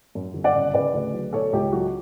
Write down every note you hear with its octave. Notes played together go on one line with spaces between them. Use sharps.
F#2
G1
D5 F#5
C#3
C#3 B4 D5
D2
F#3
B2 A4 C#5
C#2 G4
F#3 F#4